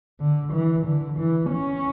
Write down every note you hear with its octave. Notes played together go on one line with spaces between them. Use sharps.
D3
E3
D3
E3
C#4